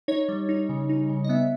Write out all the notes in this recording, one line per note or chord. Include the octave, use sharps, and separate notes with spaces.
D#4 C#5
G3
D#4
C#3
D#4
C#3
D#5
B3 E5